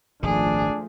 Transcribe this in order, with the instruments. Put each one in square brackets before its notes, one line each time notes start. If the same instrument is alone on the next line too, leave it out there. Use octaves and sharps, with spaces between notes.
[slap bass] D#1 G#1 D#3 [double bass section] F3 A3 [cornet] D4 [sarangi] G#4